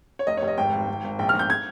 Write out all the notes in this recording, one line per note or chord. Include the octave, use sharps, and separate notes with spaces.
C#5
F1 D#5
C#5
F1
D#5
G#1 G5
G#1
G#1
G#1
A#1 G5
F6
A#1
G6
G#6